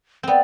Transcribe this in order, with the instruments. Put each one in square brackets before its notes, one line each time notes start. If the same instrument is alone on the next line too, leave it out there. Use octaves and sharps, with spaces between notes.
[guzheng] B3 C4 [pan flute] D5